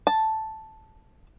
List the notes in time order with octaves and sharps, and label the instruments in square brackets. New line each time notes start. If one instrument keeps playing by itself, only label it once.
[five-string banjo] A5